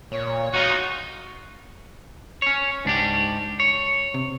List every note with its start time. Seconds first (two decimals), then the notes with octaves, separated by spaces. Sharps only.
0.11 A#2 C#5
0.53 E1 D#4 F4 F#4
2.42 C#4 C#5
2.85 C#2 G#2 D4 G4
3.60 C#5
4.14 C3